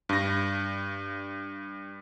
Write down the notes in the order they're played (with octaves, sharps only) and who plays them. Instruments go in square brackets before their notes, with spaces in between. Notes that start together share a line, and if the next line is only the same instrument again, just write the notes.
[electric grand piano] G2 A#6